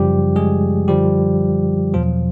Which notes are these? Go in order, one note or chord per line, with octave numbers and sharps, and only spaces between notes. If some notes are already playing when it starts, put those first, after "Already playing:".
Already playing: F#2 C#3 F3 G3 G4
G#3 G#4
F#2 D3 F3 G3 G4
E2 B2 F3 F#3 F4